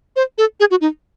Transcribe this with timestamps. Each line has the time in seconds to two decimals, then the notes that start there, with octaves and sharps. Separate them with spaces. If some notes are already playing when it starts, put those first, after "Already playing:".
0.16 C5
0.38 A4
0.60 G#4
0.71 F#4
0.81 D#4